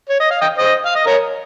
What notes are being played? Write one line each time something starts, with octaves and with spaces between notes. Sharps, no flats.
C#5
D#5
F5
D#5 G5
C5 D#5
F5
D#5
A#4 C#5